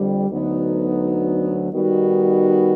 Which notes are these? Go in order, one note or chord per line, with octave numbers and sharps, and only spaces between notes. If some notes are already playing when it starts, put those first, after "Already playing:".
Already playing: F2 D3 G3
D2 D3 F#3 B3 D#4
D#3 G3 B3 D#4 F#4